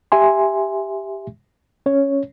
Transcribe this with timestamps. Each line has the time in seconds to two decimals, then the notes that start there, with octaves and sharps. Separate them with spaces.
0.12 G4 E5 G#5 C6
1.86 C#4 C#5